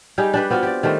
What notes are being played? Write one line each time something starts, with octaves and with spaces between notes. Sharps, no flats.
G3 D#4 G4 G#4
D4 G4 B4
B3 C4 F4 F#4
G4 D5
D#3 G3 A3 C4